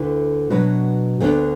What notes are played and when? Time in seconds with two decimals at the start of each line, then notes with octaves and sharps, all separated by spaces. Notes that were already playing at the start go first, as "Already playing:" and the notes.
Already playing: D2 D3 A3 E4 B4
0.50 B2 F#3 D4 F#4 B4
1.20 D2 D3 B3 D4